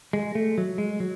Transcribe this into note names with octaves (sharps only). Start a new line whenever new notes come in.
G#3
A3
F#3
G#3
F#3